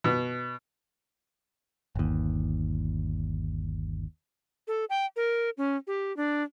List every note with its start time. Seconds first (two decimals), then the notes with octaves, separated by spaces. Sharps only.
0.04 B2
1.96 G1 D#2
4.68 A4
4.90 G5
5.16 A#4
5.58 C#4
5.87 G4
6.17 D4